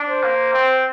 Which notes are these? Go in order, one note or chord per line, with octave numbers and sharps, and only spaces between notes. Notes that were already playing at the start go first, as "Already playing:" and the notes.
Already playing: D4
C5
A#3
C4